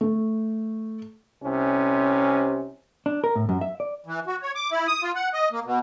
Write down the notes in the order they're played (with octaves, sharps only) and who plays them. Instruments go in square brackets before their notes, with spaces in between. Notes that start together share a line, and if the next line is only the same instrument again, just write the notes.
[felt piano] A3
[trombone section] C2 C3 C#4
[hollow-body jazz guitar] D4
A#4
A2
F#2
E5
D5
[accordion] E3
F#4
C#5
D6
E4
D#6
F4
F#5
D#5
A#3
B2